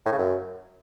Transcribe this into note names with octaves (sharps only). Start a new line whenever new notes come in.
A2
C#3
F#2